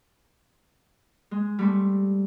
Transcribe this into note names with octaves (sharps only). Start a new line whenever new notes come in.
G#3
G3 A3 C4